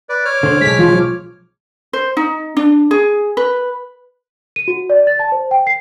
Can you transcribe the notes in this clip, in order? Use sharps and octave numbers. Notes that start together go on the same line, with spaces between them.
B4 D5
C#5 D6 F6
D3 C5
B1 E2 G#3 B6
F3
C5
D#4
D4
G#4
B4
D#7
F#4
D5
A6
A5
C5
G5
C7